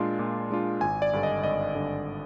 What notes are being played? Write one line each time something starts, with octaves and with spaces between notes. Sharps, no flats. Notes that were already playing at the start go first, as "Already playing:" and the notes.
Already playing: A#2 G#3 D4 F4 C6
A#2
G#3 D4 F4
G#1 G#5
D5
G2 D3
D#5
G#1 D#5
G2 D3